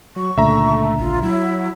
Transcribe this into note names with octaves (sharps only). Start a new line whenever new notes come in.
F#3 C#6
C#2 A#2 D3 A3 E5 A#5
A1 F4
F#3 E4